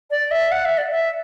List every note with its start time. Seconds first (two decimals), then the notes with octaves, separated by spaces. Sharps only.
0.10 D5
0.31 E5
0.51 F#5
0.65 E5
0.78 D5
0.91 E5